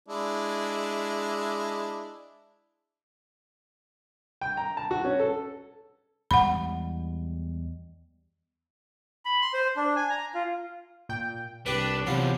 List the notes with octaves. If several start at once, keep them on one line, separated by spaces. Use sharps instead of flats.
G#3 D4 E4
G5
A#5
A5
F#4
C#4
A4
E2 G3 G#3 F#5 B5
B5
C6
C5
D4
G#5
A#5
F4
A#2 G5
C2 D4 G4 B4 F#6
E2 C3 F#3 D4 F4